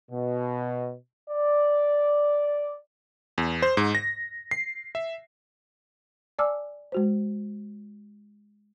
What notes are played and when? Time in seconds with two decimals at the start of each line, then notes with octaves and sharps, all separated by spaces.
0.11 B2
1.30 D5
3.38 E2
3.62 C5
3.77 G#2
3.95 A#6
4.51 C7
4.95 E5
6.39 D5 G#5 A5 D6 E6 F6
6.92 G#3 F#4 C5